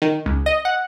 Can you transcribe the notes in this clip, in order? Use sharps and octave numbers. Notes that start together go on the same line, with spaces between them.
D#3
C#2
D#5
F#5